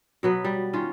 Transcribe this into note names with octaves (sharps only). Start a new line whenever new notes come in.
B2 F#3 B3
G3
D#3 C#4 F4